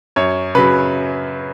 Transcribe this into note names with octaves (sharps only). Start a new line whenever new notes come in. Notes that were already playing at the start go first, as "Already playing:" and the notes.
F#2 C#5
C#3 F#3 B4